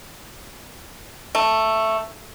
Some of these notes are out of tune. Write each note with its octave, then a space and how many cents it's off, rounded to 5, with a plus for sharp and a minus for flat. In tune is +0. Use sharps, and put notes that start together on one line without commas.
A3 +5